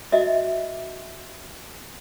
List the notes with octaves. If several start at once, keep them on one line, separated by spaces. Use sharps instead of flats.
F#4 D#5 E5